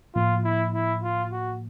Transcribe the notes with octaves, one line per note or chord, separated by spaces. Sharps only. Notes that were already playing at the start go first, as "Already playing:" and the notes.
A2 F3 A#3 F4
E4
E4
F4
F#4